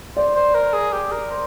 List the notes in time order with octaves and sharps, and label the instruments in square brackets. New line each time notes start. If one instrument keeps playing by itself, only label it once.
[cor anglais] C5 [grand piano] D5
[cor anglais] C5
A#4
G#4
G4
A#4
C5